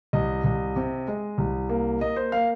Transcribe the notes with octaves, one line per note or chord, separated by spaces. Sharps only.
C2 D#5
C2
C3
G#3
C2
A#3
A#3 D#5
C5
A#3 F5